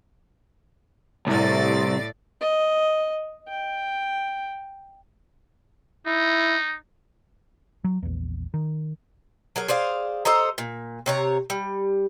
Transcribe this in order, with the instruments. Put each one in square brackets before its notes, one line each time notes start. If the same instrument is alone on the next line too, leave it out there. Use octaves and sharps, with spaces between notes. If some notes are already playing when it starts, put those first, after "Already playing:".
[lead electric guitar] C2 [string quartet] A2 D5 A6
[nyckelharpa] D#5
G5
[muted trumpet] D#4 [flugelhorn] E4
[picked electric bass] F#3
A#1 E2
D#3
[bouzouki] F#3 G#4 A#4
G#4 C5 D5 F5
A4 C5 D#5 A#5
A#2
C3 C#5 A#5
G3